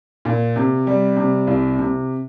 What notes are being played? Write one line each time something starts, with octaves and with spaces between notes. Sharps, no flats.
A#2
C3
G3
C3
C2
C3